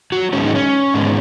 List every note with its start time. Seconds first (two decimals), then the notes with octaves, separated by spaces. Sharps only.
0.12 F#3 F#4
0.33 G#2 D#3 G#3 B3 C#4
0.44 D#4
0.55 C#4
0.94 G#2 D#3 G#3 B3